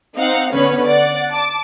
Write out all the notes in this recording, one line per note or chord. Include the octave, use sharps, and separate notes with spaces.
C4 D#4 F5 F#5
D3 B3 C#4 B4 C#5
D5 F#5
A5 D6